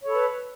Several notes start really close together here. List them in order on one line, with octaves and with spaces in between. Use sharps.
C#5 A4 B5 B4